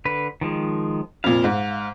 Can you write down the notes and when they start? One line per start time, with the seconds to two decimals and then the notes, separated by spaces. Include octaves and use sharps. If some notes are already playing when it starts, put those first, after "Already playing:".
0.05 D3 B4
0.41 D#3 F3 G#3
1.24 F2 A#2 F5
1.44 G#2